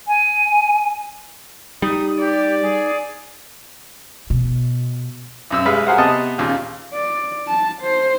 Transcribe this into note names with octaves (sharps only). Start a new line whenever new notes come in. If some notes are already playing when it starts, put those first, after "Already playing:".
G#5
G3 D#4 D#6
G4 D5
G#4
B2
B1 F#2 E6
B1 G3 G#3 B4 E5 F5
F#4 G#4 A#4 C5 F5 F#5
C3 B3 D#5 A5
D#2 A#2 C#3
D5
A5
C5